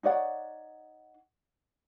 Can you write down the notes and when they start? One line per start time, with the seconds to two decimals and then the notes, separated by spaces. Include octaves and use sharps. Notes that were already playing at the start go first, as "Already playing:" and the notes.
0.03 D#4 C#5 D5 F#5